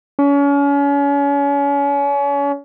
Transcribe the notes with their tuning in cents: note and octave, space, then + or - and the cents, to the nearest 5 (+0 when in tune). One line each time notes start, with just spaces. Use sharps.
C#4 +35